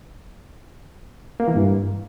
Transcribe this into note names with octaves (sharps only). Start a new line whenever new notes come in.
A#3
E3
G2